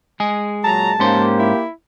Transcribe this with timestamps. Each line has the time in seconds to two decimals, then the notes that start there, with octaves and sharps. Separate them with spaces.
0.20 G#3 G#4
0.64 A#2 F#3 A5 A#5
0.99 G#2 A#3 C#4 G4 C5
1.39 E4